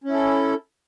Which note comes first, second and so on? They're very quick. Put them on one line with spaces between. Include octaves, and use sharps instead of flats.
C#4 E4 A4